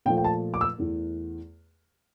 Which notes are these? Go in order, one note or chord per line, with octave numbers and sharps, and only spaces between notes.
A#2 F3 A3 G5
G5
A5
D6
E6
E2 E3 A3